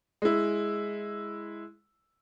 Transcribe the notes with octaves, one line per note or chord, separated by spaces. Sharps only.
G#3 E4